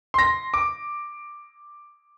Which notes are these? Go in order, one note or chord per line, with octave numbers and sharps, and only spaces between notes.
C6 A#6
D6